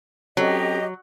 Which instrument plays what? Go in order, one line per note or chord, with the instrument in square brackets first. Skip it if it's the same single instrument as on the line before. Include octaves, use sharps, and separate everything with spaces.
[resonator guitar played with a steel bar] F#3 [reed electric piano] C4 C#4 A4 [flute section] G4 D#5